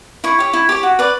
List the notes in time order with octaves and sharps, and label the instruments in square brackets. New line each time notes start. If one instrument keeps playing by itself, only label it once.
[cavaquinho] E4 C#6
G4 C#5
E4
G4 C#5
F#4
B4 D5